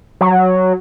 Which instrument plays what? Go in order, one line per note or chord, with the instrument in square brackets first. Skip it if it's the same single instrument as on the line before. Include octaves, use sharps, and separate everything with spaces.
[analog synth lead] F#3